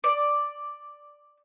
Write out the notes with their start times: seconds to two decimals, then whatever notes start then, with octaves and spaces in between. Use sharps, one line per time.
0.04 D5